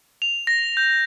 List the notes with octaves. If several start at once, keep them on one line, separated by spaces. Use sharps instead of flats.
F7
A#6
G6